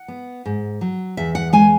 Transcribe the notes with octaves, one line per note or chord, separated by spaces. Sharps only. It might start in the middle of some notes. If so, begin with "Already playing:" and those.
Already playing: F#5
B3
G#2
F#3
E2 E5
F#5
G#3 G#5